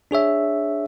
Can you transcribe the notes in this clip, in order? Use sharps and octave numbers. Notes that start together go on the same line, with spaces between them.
D4 G#4 C#5 E5